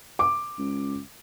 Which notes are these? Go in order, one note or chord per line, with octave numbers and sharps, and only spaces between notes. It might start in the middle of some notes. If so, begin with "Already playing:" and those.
D6
C#2